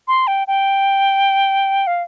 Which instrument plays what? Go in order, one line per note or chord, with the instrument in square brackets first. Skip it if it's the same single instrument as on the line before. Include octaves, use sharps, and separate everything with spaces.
[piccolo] C6
G5
G5
F5